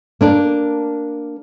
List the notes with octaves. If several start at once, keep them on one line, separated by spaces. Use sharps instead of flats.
A#3 D4 A#4